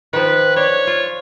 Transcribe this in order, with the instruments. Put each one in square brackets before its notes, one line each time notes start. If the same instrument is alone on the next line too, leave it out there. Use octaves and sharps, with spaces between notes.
[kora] D#3 F3 [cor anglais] B4
[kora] D4 [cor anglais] C#5
[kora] F4